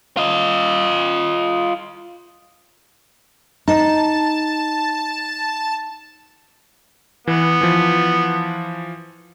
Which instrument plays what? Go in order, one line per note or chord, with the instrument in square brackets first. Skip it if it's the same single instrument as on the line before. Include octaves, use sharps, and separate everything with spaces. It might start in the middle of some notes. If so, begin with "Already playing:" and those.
[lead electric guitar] F4 D#5
[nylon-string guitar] D#4 [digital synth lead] A5
[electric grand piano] E3 [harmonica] B3
[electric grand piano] E3 F3